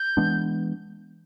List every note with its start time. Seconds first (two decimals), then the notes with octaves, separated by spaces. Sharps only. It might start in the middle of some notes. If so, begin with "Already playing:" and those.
Already playing: G6
0.17 E3 G#3 B3 D4